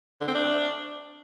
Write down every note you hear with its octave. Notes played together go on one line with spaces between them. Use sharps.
D3
C4
D4